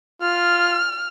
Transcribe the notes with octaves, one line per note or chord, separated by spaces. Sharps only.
F4 F6